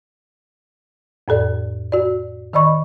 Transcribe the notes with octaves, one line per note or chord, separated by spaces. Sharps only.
F2 A2 A4 D5
F#4 D5
D#3 D5 D#5 B5 C#6